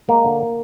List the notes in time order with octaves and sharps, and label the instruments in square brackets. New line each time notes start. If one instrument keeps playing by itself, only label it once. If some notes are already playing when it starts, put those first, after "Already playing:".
[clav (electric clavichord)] G#3 A#3
D3